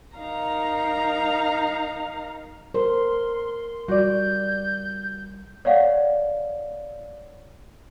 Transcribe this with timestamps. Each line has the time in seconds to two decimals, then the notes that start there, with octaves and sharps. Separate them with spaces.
0.17 D#4 A#4 F5 A#5
2.74 A#4 C5 C6
3.88 G3 F#4 D5 G6
5.65 C#5 D5 F5 F#5